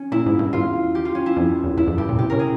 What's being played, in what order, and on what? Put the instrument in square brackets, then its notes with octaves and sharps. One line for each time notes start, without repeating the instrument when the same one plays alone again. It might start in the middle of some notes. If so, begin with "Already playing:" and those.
Already playing: [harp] C#4
[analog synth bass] A#2 [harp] E4
[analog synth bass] G#2
G2
[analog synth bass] E2 [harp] F4
[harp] G4
F4
C#4
E4
[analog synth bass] F2
E2
[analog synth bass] E2 [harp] E4
[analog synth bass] F2
[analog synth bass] G2 [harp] G4
[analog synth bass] A#2
[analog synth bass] C3 [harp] G4
[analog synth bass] C#3 [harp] A#4
[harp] G#4